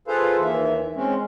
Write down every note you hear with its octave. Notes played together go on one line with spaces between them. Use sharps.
F4 G#4 A4 B4 C5 F5
D#2 E3 E5
G#3 C4 C#4